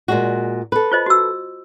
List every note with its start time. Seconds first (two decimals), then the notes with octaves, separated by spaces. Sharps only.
0.08 A#2 G#3 F#4
0.72 A4 B4
0.92 F4 C5 D#5
1.06 F#4 E6